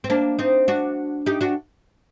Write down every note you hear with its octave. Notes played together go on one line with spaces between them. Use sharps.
C4
A#3 D4
C4 D#4
D4 F#4
D#4 G4
D4 F#4